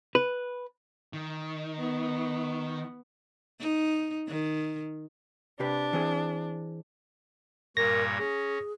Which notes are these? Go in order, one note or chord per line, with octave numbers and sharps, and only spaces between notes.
B4
D#3
B3
D#4
D#3
C3 D4 G4 B4
E3 C4 G#4
G2 A#2 A#4 C#5 A#6
C#4 G#4